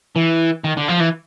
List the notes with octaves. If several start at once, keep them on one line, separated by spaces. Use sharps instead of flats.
E3
D#3
D3
F3
E3